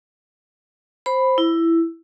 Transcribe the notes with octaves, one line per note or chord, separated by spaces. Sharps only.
C5 B5
E4